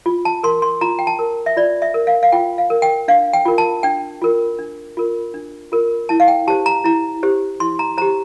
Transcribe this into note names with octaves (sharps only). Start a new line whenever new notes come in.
F4
A5
A#4 C6
C6
F4 A#5
G5
A5
A#4
E5
F4 D5
E5
A#4
F5
F5
F4 G5
F5
A#4
G5
D4 F5
G5
F4 A#4
A5
D4 G5
F4 A#4
D4
F4 A#4
D4
F4 A#4
E4 A5
F5
G5
G4 C5 A5
A#5
E4 A#5
G4 C5
E4 C6
A#5
G4 C5 A#5